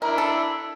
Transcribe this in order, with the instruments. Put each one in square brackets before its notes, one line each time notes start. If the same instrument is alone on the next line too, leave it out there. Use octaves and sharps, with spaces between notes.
[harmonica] D4 E4 [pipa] A#4
[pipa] A4